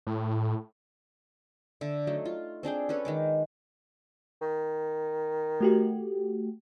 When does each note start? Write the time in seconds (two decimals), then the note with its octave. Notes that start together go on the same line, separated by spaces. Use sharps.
0.07 A2
1.81 D3 E5
2.07 F#3 A3 D#4
2.25 F4
2.63 C4 D4 G#4 G5
2.89 C#4 A4 B4 C#5
3.05 D#3 G#3 D6
4.42 D#3
5.61 A3 F#4 G4